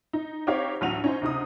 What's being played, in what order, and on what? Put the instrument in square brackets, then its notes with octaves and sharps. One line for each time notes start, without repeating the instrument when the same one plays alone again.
[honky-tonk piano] D#4
C4 D#4 G4 C#5 F5
A1 D2 F#3 F#5 D#7 F7
C#4 D#4 C5
D2 C3 D#4 D#6